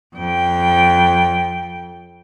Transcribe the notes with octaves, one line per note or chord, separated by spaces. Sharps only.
F2 G5